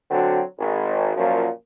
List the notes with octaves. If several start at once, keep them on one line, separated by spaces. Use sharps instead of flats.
D3 F#3 C4 F#4
G#1
F#2 A#2 F3 F#3